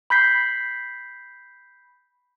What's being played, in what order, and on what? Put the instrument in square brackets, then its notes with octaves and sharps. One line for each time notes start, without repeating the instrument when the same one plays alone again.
[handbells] B5 G6 B6 C7